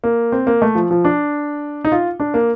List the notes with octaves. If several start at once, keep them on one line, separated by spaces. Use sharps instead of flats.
A#3
C4
A#3
A3
F3
F3
D4
D#4
F4
D4
A#3